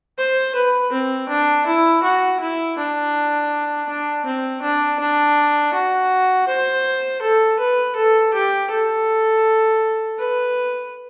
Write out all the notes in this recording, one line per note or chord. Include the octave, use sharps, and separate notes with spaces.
C5
B4
C4
D4
E4
F#4
E4
D4
D4
C4
D4
D4
F#4
C5
A4
B4
A4
G4
A4
B4